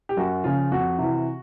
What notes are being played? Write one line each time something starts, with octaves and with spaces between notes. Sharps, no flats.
G4
F#2 F#4
C#3 F3 F4
F2 F#4
C3 E3